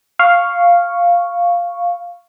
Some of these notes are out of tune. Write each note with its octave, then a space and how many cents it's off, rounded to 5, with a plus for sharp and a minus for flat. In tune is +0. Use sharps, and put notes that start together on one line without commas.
F5 +0 C#6 +0